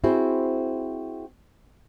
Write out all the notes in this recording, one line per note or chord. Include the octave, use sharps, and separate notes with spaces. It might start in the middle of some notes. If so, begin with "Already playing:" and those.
C4 E4 F#4 G#4 C5